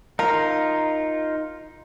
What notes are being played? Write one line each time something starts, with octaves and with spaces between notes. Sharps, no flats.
D#4 F4 A#4